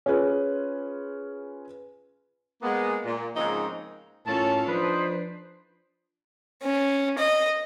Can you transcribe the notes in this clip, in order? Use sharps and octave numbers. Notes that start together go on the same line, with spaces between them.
C#4 F4 G#4 B4
G#3 A#3 B3
A#2
G#2 C#3 F3 A#3 C4 D#4
A2 C#4 F4 A4 A#4 C#5 A5
F3 D4 D#4 B4 C5 D#6
C#4
D#5